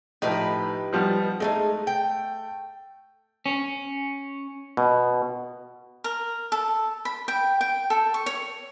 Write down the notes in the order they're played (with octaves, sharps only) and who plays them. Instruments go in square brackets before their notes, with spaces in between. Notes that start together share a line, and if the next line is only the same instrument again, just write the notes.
[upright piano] A2 F3 [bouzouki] D#4 G4 B4
[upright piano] F3 G3 B3
[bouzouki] G#3 C4 D#4 [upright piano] A3
[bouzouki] G5
[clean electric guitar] C#4
[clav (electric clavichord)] B2
[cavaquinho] A#4
A4
B5
G5
G5
A4
C#6
C#5